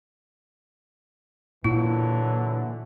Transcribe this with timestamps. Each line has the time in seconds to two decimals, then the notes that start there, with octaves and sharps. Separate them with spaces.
1.64 A#2 D3 E3 F#3 E4